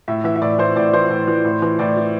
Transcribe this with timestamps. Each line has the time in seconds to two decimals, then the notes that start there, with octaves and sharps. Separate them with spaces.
0.08 A2 E5
0.24 E3 E5
0.36 E5
0.42 A2 D5
0.59 E3 C5
0.76 A2 D5
0.93 E3 C5
1.10 A2
1.28 E3
1.44 A2
1.62 E3
1.79 A2 D5
1.97 E3